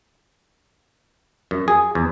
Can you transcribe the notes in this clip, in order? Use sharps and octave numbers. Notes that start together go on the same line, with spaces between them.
F#2
G#4
E2